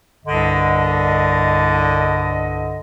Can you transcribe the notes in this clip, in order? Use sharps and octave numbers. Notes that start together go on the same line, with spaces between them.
C2 G2 D3 D#5